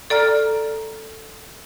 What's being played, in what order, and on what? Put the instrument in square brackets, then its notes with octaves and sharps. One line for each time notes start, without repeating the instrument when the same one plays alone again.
[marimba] A4 D5 A#5 F6